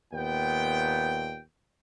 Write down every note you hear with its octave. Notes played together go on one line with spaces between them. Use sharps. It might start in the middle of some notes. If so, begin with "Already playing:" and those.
D#2 A#2 B3 G5